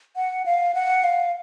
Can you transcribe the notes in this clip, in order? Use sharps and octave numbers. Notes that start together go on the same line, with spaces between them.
F#5
F5
F#5
F5